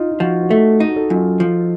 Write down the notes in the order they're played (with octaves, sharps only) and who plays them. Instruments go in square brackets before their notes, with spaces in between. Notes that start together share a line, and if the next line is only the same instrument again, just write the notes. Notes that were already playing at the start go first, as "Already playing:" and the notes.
Already playing: [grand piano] D#4 F4
F4
[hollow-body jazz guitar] F3 [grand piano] F#4
[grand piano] F#4
[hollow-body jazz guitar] A3 [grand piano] A4
[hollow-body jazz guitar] D#4 [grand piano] A4
[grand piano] F#4
A4
[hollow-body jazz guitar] F#2 [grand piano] F4
[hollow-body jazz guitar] F3